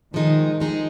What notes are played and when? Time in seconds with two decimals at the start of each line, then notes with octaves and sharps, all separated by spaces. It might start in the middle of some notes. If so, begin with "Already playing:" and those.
0.14 D#3 F3 G#3 D#4 G#4
0.60 F3 G#3 D#4 G#4